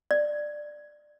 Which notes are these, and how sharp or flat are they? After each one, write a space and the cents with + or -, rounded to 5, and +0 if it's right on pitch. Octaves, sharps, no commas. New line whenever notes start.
D5 +15